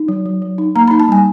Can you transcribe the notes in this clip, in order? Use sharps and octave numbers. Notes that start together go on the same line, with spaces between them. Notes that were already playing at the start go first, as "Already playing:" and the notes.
Already playing: D#4
F#3
F#3
F#3
D#4
A#3 A#5
D#4 B5
A5
G3 G#5